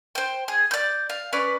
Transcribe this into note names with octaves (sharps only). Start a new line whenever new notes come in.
C5 G5
G#4
D5 G6
F5
C#4 B4 D5